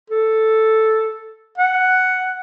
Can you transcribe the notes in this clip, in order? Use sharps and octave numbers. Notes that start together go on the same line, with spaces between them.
A4
F#5